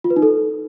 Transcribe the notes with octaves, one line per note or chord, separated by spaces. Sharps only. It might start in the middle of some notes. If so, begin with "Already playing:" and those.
F4
B4
D#4
A4